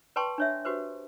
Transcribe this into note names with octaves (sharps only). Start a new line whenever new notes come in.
B4 D5 G5 A5 C6 C#6
D4 C#5 E5
F#4 G4 B4 C5